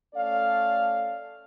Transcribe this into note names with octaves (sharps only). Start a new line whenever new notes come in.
A3 C#4 A4 D5 F5